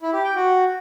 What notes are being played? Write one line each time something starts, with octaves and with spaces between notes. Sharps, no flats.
E4
G4
G5
F#4